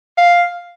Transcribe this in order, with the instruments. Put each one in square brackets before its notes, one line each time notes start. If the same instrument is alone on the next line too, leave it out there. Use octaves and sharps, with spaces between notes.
[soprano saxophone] F5